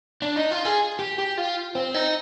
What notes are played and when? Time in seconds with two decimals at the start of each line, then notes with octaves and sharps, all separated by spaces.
0.22 D4
0.36 D#4
0.51 F4
0.65 G#4
0.99 G4
1.18 G4
1.37 F4
1.75 C4
1.94 D#4